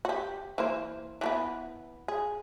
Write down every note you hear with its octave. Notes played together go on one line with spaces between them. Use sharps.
F#4 G4
E3 A#3 C5
E3 A3 B3
G#4